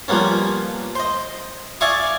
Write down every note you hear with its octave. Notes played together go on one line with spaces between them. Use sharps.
F3 G3 A#3 B3 C#4
C5 D#5
D5 E5 F5 G#5 C#6 D#6